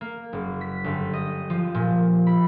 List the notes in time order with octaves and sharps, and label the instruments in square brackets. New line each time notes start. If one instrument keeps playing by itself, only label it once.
[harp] A#3
F#1
B6
G1
D#5
F3
A#2
B5